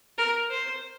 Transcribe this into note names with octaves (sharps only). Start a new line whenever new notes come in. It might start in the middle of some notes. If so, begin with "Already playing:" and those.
A#4
C5